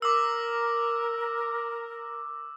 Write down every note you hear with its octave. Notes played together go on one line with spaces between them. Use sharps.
A#4 D6 E6